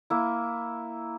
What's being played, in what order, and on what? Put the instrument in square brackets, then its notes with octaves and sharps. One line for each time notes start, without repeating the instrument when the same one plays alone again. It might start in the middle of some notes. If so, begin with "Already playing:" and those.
[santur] A#3 E4